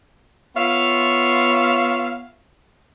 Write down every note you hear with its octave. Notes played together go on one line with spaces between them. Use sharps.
B3 F4 C#5 E5 F5